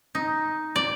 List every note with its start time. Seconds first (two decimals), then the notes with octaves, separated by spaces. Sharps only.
0.15 D#4
0.76 D5